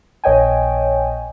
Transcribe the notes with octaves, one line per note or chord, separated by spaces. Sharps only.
A#1 C#5 D#5 G5 G#5